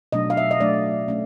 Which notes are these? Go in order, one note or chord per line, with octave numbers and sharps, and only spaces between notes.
B2 F#3 A3 D4 D#5
F5
E5
D#5
B2 F#3 A3 D4 D5
A3 C#4